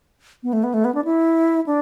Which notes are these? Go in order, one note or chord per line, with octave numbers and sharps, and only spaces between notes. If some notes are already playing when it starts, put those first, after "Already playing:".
B3
A3
B3
A3
B3
D4
E4
D4